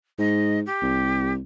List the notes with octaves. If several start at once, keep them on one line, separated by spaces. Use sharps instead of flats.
G#2 D#5
G4
C2